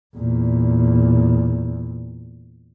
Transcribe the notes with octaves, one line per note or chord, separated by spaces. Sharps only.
E2 A#2